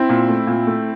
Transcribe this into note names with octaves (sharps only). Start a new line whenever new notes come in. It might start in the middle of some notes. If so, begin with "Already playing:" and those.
Already playing: C4 E4
A#2
A3
A#2
A3